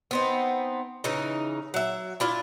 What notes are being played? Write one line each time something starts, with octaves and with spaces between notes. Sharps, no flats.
B3 C4 D#4
C#3 E3 D#4
F#3 E5
D4 E4 F4